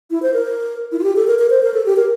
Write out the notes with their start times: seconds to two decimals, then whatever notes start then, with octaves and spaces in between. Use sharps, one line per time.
0.11 E4
0.22 C5
0.33 A#4
0.92 E4
0.99 F4
1.03 G4
1.16 A4
1.27 A#4
1.39 A#4
1.50 C5
1.63 A#4
1.74 A4
1.86 G4
1.96 A#4